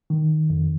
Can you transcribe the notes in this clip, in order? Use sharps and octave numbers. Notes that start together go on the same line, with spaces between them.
D#3
F2